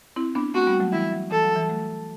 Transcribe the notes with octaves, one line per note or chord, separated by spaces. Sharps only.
C4 E4
B3 D4
A3 C4 F#4
G3 B3
F#3 A3
E3 G3 E4
F#3
E3 A4
F#3
E3 G3
F#3 A3